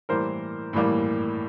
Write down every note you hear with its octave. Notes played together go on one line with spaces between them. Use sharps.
A2 E3 G3 A#3 A#4 C5
A2 E3 G3 A#3